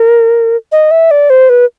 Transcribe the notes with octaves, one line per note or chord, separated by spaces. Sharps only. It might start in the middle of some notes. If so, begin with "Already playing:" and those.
Already playing: A#4
D#5
E5
D5
C5
B4